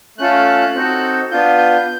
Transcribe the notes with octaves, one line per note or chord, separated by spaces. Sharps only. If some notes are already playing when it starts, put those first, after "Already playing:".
A3 C#4 F4 A4 F#6
C4 D#4 F#4 A4
B3 D4 F4 G6
G6